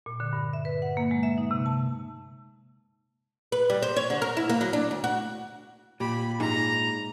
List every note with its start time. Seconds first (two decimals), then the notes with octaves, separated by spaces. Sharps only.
0.06 A#2
0.20 D3
0.33 G2
0.53 E5
0.65 B4
0.82 F#5
0.97 A#3
1.11 G#3
1.23 E5
1.38 D#4
1.51 C3
1.66 A5
3.52 B4
3.70 G3
3.82 C5
3.96 C#5
4.10 D3
4.22 A#4
4.37 E4
4.49 A#3
4.61 F#3
4.73 D4
4.91 D2
5.04 F#4
6.00 A#2 G4 B5
6.40 G#2 A#5